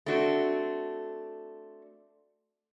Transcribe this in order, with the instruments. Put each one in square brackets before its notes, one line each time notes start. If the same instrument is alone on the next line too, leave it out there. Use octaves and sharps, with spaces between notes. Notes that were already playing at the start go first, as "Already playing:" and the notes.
[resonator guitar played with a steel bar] A3 C4 D4 F#4